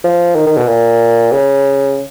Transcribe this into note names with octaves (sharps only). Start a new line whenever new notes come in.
F3
D#3
D#3
B2
A#2
C#3